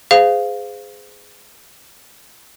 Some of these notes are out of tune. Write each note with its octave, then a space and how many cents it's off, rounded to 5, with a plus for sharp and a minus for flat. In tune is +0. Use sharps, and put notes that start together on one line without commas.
G#4 +0 C5 -30 F5 +0